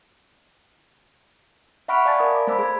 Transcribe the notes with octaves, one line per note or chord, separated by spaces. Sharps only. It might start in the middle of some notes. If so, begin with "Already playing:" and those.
E5 F#5 B5 C#6 F6 D7
D5 F5 G#5 A5 B5 A6
A#4 F5 G#5 D#6
D6
A3 C5 B5 D6 E6
G#4 G#6